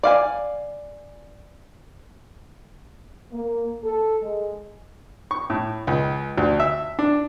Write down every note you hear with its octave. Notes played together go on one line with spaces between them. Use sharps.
D5 F5 G#5
A#3
A4
G#3
C#6
A2
C#2
D2
E5
D4